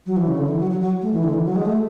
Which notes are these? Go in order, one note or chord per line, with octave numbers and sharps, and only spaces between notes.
F#3
E3
C#3
D3
E3
F#3
F#3
F#3
A3
E3
D3
E3
F#3
G#3
A3